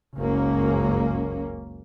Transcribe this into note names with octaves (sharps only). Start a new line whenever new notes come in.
F#1 C#2 G#3 A#3 C#4